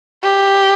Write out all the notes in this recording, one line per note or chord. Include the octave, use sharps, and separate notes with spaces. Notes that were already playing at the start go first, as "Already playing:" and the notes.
G4